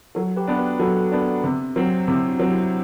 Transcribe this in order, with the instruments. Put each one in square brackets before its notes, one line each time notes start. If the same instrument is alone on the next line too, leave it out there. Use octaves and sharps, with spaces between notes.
[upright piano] F#3 [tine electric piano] F#4 A4
[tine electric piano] G4 B4
[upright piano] B3 D4
[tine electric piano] G4 B4
[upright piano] F#3 [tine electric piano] F#4 A4
[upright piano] B3 D4
C3
F#3 C4
[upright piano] C3 [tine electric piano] E4 G4
[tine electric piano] D4 F#4
[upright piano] F#3 C4
[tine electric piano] E4 G4